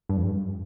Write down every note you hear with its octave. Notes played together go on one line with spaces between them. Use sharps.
G2
F2
G2